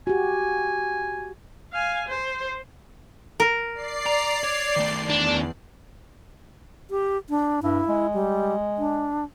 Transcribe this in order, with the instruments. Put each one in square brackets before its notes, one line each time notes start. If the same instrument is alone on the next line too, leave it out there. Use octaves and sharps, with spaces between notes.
[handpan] F#4 G4 [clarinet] G#5
[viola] F5 G#5
C5
[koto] A#4
[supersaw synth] D5 C7
[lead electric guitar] A#5
C#5
D#3 A3
[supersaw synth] E2 [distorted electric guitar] D4
[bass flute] G4
D4
[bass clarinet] G2 [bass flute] E4
[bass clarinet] G#3
[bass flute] G3
D4